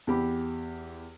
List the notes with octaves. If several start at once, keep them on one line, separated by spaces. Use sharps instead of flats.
E2 G4 B5